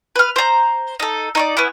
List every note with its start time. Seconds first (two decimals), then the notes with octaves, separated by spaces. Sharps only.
0.16 B4 F6
0.36 C5 A#5
1.00 D#4 A4
1.35 D#4 C#5 D5
1.57 B3 C#4 E4